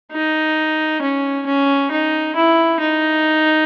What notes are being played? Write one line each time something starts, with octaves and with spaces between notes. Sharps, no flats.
D#4
C#4
C#4
D#4
E4
D#4